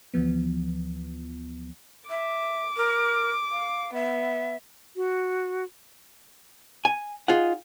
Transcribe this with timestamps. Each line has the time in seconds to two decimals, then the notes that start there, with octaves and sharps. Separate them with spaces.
0.14 D2 E3 F3 B3
2.10 E5 D6
2.77 A#4
3.52 F5
3.94 B3 E5
4.96 F#4
6.85 G#5
7.28 D#4 F4 G#4 F#5